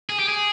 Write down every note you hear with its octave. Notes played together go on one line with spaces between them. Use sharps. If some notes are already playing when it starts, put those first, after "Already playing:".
G#4
G4
G#4